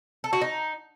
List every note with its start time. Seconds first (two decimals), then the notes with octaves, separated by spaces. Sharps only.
0.24 A4
0.33 F#4
0.42 D#4